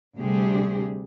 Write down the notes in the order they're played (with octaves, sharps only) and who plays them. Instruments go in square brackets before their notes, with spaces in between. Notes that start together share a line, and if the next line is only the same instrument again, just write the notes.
[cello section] D2 C3 G3 D4 G4 G#4